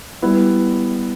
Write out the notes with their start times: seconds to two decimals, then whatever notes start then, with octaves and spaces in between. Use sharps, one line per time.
0.22 G3 B3 E4